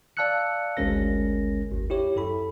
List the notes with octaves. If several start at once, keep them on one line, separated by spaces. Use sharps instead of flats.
D5 F5 A5 E6 F#6 C#7
G#1 D2 G#3 C#4 A#4 A#6
G#1 D#2
E4 G4 C#5
F#2 A4 B5